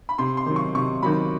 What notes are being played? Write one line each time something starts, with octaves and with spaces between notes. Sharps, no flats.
B5
C3 C6
C6
D#3 F#3
C#6
C3 C#6
D#3 F#3 B5